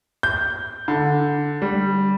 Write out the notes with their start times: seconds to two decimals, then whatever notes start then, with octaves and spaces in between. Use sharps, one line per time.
0.23 G6
0.88 D3
1.62 G3